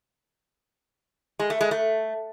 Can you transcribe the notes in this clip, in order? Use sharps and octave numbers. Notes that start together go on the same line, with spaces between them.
G#3
A3
G#3
A3